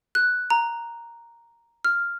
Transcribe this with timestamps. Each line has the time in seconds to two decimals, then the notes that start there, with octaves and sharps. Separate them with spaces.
0.15 F#6
0.50 A#5
1.85 F6